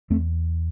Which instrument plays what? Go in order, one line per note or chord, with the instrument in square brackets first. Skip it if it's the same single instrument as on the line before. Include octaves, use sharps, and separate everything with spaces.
[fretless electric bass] E2 A3 C4